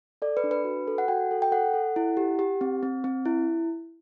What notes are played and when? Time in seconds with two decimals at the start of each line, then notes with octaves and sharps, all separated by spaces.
0.22 A4 D5
0.37 B4
0.44 D4
0.51 B4
0.65 F#4
0.87 A4
0.98 F#5
1.08 F#4 G5
1.31 A4
1.42 G5
1.52 A4 F#5
1.74 A4
1.96 E4
2.17 G4
2.39 G4
2.61 C4
2.83 C4
3.04 C4
3.26 E4